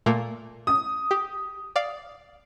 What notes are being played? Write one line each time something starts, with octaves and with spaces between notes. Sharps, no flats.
A#2 A3 A#3
D#6
G4
D5 F5